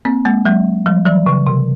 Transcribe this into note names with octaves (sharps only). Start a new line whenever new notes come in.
A#3 C4
G#3 A#3
F#3 G#3
F3 G3
E3 F#3
C#3
C3